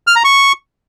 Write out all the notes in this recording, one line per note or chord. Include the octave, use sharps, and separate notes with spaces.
F6
A#5
C#6